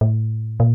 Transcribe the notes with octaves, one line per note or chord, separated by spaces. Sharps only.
A2
A#2